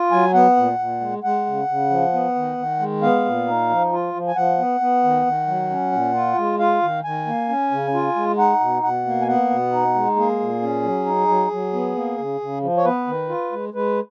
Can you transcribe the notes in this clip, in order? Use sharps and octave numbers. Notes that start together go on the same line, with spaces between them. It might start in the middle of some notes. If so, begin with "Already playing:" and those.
Already playing: F4
F#3 G#5
B3 F#5
A#2
A#2
G#3
G#3 F#5
C#3
C#3
F3
B3
D#3
D#3
G#3
B3 F5
A#2
D#4
F3
F4
F3
G#5
F3 F#5
B3
B3
D#3
D#3
F#3
C#4
A#2
F4
G#3
F4 F5
D#3
D#3 G#5
A#3
C#4
C#3
F4
G#3
D#4 F#5
B2
B2 F#5
A#3
G#5
B3 F#5
B2
D#4
G#3
A#3 G#4
A#2
C#4
F#3
D#4
F#3
F#3
B3
A#3
C#3
C#3
F3
C#5
B3 B4
D#3
F4
G#3
G#3 B4